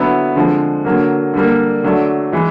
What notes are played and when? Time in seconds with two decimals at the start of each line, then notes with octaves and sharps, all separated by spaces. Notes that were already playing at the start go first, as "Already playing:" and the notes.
Already playing: D3 F#3 B3 E4
0.36 D3 F3 G#3 C4
0.85 D3 F#3 A#3
1.34 D3 G3 A#3
1.84 D3 F#3 A3 D4
2.32 E3 G#3